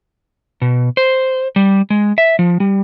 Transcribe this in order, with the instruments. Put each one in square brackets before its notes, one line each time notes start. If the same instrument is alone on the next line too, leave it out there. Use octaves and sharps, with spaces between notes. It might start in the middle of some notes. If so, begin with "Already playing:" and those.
[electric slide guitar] B2
C5
G3
G#3
E5
F3
G3